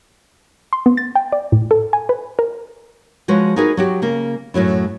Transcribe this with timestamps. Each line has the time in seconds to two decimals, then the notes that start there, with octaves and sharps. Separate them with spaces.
0.73 C6
0.86 B3
0.97 A6
1.15 G5
1.32 D5
1.52 A2
1.71 A4
1.93 G#5
2.09 B4
2.39 A#4
3.28 F3 G#3 F#4 B4 C#5
3.56 D#4 E4 F#4 G#4 A#4 B4
3.77 F#3 F#4 G4
4.02 C#3 A#3
4.54 F#2 A2 F#3 E4